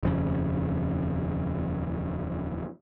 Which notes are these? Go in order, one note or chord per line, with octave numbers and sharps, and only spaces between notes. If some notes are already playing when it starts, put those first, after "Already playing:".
D#1 F2 C#3